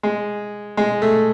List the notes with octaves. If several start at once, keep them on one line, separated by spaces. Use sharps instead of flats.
G#3
G#3
A3